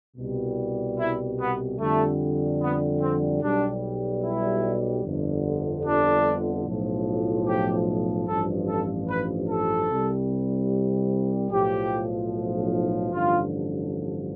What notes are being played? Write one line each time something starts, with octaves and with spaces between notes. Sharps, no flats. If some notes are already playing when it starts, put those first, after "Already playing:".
C2 B2 G3
E4
B3
F2 D3 G3 A3
B3
C4
B1 B2 G3 D4
E4
G1 F2 D3
D4
B1 A2 F3
G4
A1 G2 F3 A4
A4
B4
A4
C2 C3 G3
B1 A2 F3 G4
A1 G2 D3 F3 F4